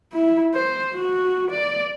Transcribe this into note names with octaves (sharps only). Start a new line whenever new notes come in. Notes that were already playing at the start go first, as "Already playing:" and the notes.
E4
C5
F#4
D5